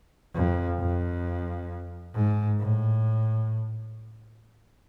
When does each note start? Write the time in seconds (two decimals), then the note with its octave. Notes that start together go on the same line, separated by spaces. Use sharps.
0.34 F2
0.79 F2
2.14 G#2
2.60 A2